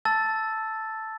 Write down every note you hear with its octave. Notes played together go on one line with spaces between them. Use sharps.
A5 E6 A6